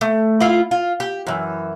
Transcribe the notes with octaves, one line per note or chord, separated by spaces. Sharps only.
A3
E4 F4 F5
F4
G4
F#2 E3